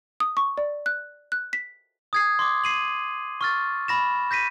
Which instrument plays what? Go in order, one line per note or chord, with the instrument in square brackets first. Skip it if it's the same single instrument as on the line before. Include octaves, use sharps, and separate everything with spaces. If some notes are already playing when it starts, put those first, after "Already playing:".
[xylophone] D#6
C#6
D5
F#6
F#6
B6
[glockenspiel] D#6 G#6 C7
C6 D6
C7 D#7 F#7
C#6 F6 A6
B5 A#6 E7
G6 A#6 B6 D#7